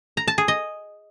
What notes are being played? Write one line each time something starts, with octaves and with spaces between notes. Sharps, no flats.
A#5
A5
G#4
D#5